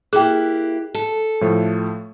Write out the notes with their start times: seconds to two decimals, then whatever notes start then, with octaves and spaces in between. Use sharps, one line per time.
0.13 A#3 E4 G4 G#4 G5 F#6
0.94 A4
1.41 A2 F3 A3